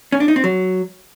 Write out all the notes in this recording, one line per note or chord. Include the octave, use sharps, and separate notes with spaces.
C#4
D4
D#4
C4
F#3